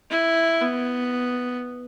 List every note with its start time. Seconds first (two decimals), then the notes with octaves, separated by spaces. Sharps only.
0.10 E4
0.61 B3